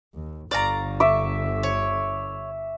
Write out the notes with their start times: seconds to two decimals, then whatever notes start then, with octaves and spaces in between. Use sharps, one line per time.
0.14 D#2
0.51 G1 D3 D5 F5 A#5 C#6
1.00 E5 C#6 D6
1.63 C#5